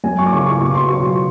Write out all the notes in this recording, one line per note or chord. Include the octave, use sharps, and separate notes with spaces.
F#2 G#5
C#6
D6
C#3 C#6
C#6
B2 C#6
C6
F#3 C#6